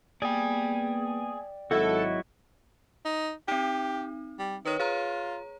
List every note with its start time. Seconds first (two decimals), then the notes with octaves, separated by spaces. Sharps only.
0.22 A#3 B3 G#4 D5 G5
1.71 G#1 F#3 E4 F#4 A4 D#5
3.05 D#4
3.48 C4 D#4 G4
4.39 G3
4.65 D#3 B4 C#5
4.79 F4 G#4 C#5 A#5